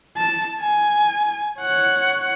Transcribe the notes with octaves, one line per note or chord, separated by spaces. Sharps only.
A5
G#5
C#5 F#5